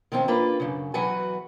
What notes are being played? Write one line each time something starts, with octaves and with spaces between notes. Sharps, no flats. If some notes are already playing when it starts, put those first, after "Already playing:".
D#3 F3 C4 C#4
A#3 D4 F4 B4
F#2 C#3
E2 E3 F#3 F#4 B4 G#5